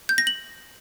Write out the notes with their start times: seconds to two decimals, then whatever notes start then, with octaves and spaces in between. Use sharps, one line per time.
0.09 G6
0.18 A#6
0.27 F#7